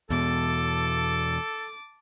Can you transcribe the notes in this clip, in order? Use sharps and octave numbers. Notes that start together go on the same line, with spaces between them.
E2 B2 A4 A5 D6